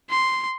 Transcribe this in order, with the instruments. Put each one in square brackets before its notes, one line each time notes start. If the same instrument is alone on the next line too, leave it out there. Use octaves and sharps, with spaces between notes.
[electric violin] C6